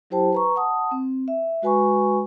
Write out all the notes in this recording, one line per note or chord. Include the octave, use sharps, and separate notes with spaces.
F#3 E4 G4 C5 G5 A5
B4 A#5 C#6
F#5 A5 D#6
C4
E5
G#3 F#4 B4 G#5 B5 C#6